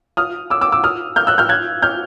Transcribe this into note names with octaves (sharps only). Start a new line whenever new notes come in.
D#6 F6
D6 E6
D6 E6
D6 E6
D#6 F6
F6 G6
E6 F#6
F6 G6
F#6 G#6
F6 G6